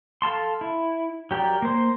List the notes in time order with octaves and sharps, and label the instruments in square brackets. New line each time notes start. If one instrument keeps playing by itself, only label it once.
[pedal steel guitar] A4 F5 A5 C6
E4
F#3 G4 A#4 D5
A#3 C5